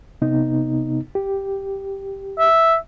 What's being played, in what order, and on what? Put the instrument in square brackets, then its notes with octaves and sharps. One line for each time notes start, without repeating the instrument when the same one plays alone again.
[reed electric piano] C3 B3 D#4
G4
[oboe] E5